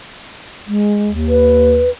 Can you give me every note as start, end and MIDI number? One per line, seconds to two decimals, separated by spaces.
0.67 1.11 56
1.07 1.89 39
1.29 1.90 71